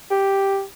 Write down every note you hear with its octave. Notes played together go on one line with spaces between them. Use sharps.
G4